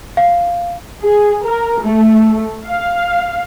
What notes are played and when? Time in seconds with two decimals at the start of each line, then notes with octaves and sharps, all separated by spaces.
0.17 F5
1.03 G#4
1.44 A#4
1.84 A3
2.66 F5